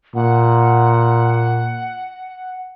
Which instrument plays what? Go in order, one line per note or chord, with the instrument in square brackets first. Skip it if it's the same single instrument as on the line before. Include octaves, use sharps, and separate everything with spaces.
[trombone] A#2 [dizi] F#5